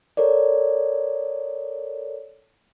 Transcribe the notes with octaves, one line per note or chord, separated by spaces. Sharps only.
A4 A#4 C#5 D5